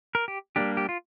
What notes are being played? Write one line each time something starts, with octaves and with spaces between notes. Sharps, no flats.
A#4
G4
G3 A#3 D4 G4
G4
F4